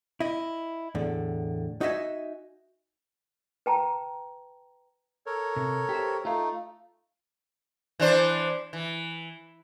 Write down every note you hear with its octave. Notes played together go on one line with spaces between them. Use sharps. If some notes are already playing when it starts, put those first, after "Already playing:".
E4 D#5
E2 A2 D3
D#4 F#4 D#5 E5 G#5
B4 G5 A5 A#5
A4 A#4 C#5
C3
G4 C5
A3 D#4 F4 F5
E3 D4 C5
E3